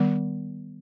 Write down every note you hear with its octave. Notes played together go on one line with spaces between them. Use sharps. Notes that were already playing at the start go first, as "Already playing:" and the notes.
Already playing: D#3 G3 B3